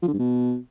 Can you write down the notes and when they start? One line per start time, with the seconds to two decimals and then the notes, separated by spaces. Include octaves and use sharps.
0.02 F3
0.08 D3
0.13 G2
0.19 B2